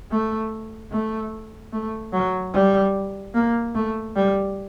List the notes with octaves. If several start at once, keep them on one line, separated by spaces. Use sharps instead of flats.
A3
A3
A3
F#3
G3
A#3
A3
G3